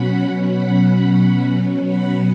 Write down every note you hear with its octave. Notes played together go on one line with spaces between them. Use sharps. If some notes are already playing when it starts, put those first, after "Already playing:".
Already playing: B2 F#3 C#4 F#5 B5
F#5 B5
F#5 B5